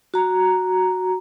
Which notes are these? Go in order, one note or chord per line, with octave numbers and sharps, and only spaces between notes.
F#4 A#5